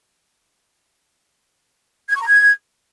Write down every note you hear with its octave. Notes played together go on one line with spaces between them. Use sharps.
G#6
C#6
A#5
G#6